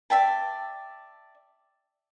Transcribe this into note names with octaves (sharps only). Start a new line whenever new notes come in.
D5 E5 G5 A5